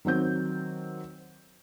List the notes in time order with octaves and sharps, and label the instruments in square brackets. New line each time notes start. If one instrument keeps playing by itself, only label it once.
[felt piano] D#3 F#3 C4 G6